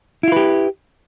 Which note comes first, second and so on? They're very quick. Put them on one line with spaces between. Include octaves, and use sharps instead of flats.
E4 F4 B4 G4